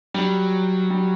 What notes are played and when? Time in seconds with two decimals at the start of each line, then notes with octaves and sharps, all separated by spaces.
0.14 F#3 G3
0.90 G3